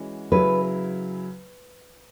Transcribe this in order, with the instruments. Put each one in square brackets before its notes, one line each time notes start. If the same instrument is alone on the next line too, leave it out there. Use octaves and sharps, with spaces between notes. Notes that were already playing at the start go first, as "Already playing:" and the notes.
Already playing: [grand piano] E3 G#3 C#4 F#4
[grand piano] C#3 F#3 E4 [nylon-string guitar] B4